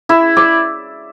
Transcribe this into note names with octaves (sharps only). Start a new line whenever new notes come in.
E4 E5
D5